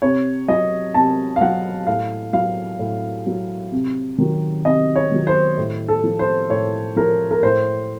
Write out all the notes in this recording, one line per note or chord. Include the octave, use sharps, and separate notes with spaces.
C3 C#5
F#3 D#5
C3 A5
F5
F#3 F#5
A2 F5
F#3 F5
A2
F#3
C3
D#3 F#3
C3 D#5
C#5
D#3 F#3
C5
A2
A4
F3
C5
A2 C#5
F3 A#4
A#4
A2 C5